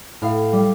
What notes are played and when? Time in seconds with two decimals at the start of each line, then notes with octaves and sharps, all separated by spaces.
0.22 A2 F5
0.53 G3